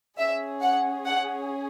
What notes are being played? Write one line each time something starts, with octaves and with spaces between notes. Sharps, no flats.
C#4 G#4 E5
F#5
F#5